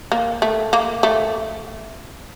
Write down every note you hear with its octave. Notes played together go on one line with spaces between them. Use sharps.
A#3
A3
A#3
A3